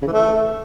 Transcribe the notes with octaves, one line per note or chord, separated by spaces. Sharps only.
C#3
E3
A3